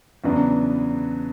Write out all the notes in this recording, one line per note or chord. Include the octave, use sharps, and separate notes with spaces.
E2 C#3 F#3 B3 D4